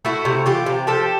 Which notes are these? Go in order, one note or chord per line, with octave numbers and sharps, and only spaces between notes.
A3 E4 F#4
C3
E3 F4 G4
C3
F3 G4 A4